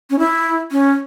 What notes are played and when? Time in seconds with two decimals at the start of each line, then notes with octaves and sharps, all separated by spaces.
0.10 C#4
0.19 E4
0.72 C#4